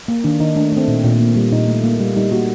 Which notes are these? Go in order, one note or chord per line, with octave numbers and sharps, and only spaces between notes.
A#3
D#3 D4
D#3 D#4
A3 D4
A3 C4
A#2
A#2
A#3
G3
A#2 D#4
A3
A#3
G3
G3 D#4
A#3 F#4